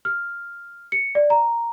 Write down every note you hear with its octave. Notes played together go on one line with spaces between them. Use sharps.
F6
C#7
D5
A#5